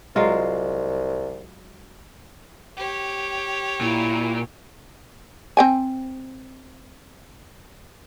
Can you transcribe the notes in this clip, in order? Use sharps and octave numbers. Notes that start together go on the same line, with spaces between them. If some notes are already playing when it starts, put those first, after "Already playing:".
C2 F#3 G#3 F4
G4 C#5
A#2 E4
C4 G5 G#5